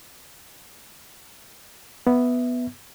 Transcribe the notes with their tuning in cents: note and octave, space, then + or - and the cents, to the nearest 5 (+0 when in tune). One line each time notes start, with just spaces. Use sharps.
B3 +0 E5 +0